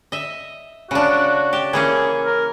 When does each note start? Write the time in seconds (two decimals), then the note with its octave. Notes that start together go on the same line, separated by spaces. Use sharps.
0.12 D#5 E5
0.91 C#3 D4 F#4
1.53 G4 A5
1.73 E3 A#3 C#4 G#4
2.26 A#4